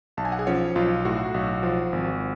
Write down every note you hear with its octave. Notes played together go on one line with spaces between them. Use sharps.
B1 A5
G#5
F#5
G#4 G#5
F3 C#4 C#5
B1 F4
A2 F#4
B1
F3
G#1